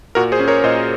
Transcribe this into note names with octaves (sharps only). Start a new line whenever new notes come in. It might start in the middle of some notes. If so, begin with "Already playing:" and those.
A#2 F#4 A#4
G#4 C5
C#4
A#4 C#5
A#2 C5 D#5